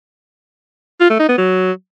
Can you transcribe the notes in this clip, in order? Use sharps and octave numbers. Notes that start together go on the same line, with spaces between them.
F4
A3
D#4
B3
F#3